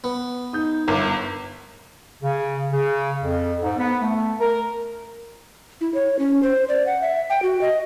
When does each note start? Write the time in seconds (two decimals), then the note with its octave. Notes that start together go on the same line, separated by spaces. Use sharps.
0.04 B3
0.53 D#4 D#6 G6
0.88 G1 A#4 E5 D6
2.22 C#3
2.71 C#3
3.22 F2
3.61 G#2
3.78 B3
4.02 A3
4.39 A#4
5.81 E4
5.94 C#5
6.19 C#4
6.43 C5
6.69 D5
6.86 F#5
7.02 E5
7.30 G5
7.42 F#4
7.61 D#5